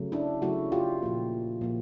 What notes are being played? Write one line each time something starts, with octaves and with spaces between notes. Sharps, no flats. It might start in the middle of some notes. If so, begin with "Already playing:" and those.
Already playing: C#3 F#3 A3
D4 E4
C#3 F#3 A3 E4 F#4
F4 G4
A#2 F3 A#3
A#2 F3 A#3